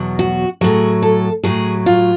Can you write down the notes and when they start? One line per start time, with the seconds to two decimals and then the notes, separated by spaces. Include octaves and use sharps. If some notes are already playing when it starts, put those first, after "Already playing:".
Already playing: E2 B2 F#3
0.19 F#4
0.61 A2 F#3 G#4
1.02 A4
1.43 A2 F#3 G#4
1.86 F4